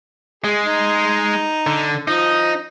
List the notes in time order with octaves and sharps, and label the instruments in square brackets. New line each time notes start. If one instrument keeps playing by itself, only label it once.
[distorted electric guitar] G#3 [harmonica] G#4
[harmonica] D#4
[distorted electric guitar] D3
[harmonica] F3 D#6 [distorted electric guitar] D#4